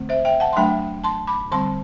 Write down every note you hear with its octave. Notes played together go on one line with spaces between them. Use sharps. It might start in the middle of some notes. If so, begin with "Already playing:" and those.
Already playing: D3 A3 C4
C5 E5
E5 G5
F#5 A5
C6
F#3 A3 D4 G5 B5
A5 C6
B5 D6
D3 G3 C4 A5 C6